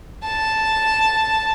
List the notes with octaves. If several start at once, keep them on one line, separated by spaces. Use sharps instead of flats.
A5